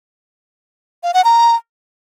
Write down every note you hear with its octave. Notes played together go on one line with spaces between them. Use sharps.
F5
F#5
A#5